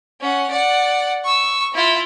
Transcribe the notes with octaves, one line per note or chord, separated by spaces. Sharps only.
C#4 F#5
D5 F#5
C#6 E6
E4 F4